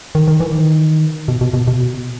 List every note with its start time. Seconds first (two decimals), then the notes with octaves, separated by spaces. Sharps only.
0.15 D#3
0.28 D#3
0.40 E3
0.52 D#3
1.28 B2
1.41 B2
1.54 B2
1.67 B2